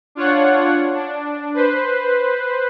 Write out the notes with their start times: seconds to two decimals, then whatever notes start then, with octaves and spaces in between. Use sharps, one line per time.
0.15 D4 F4 C#5 F#5
0.94 D4
1.54 B4 C5